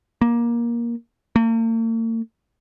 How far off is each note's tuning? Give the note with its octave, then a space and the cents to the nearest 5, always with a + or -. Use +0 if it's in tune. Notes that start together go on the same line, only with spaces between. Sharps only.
A#3 +15
A#3 -45